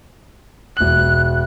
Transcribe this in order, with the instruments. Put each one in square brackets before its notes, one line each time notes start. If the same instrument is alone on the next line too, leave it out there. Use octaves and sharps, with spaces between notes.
[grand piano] E1 F#7 [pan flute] F#6